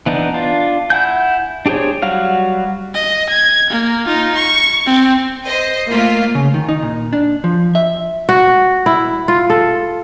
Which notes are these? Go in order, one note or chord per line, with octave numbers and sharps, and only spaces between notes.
E3 B3 D4 D#4
D4 F4
E4 F#5 G#5 G6
D4 G4 G#4 C5 C#5
F#3 G3 F#4 F5
D#5
G#6
A#3
D#4 F4
C#6
C4
C5 D#5
A3 A#3 F4
C#3
D#3
D#4
A#2
D4
F3
E5
F#4
E4
F4
A4